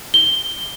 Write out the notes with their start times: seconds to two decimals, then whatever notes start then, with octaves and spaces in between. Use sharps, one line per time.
0.14 G7